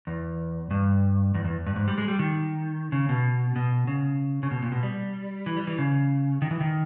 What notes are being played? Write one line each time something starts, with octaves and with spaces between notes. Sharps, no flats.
E2
G2
E2
E2
G2
G#2
G3
G#3
G3
D#3
C#3
B2
B2
C#3
C#3
B2
A#2
B2
G3
E3
G3
E3
C#3
D#3
E3
D#3